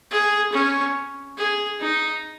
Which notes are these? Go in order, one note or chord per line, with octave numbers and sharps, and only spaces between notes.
G#4
C#4
G#4
D#4